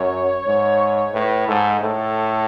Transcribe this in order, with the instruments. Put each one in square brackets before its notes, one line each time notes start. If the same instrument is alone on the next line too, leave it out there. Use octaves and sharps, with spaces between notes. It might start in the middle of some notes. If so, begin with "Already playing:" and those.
Already playing: [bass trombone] F#2 [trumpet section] C#5
[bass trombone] G#2
[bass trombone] A2 [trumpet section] B4
[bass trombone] G#2 [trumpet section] A4
[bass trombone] A2 [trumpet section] A4